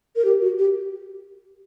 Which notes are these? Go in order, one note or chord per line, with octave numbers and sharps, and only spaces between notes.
A#4
G4
F#4
G4